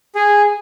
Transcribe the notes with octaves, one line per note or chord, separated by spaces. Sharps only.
G#4